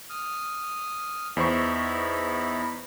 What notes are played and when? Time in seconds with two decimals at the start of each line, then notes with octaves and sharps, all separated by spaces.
0.10 D#6 F6
1.37 E2 D#4 E4 C5 B5 C#6